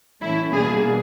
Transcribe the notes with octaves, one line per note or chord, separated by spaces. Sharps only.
A2 E3 A3 C#4 E4
B2 G3 A#3 D4 G#4